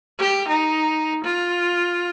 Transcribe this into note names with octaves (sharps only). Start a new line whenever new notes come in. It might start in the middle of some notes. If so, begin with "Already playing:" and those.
G4
D#4
F4